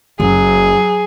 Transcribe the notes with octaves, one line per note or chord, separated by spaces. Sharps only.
F#1 F#3 G#4